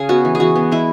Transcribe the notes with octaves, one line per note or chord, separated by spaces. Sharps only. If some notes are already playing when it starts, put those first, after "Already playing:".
Already playing: C#3 G#4
B3 F#4
E3
G#4
E3 F#4
B3
G#3 E4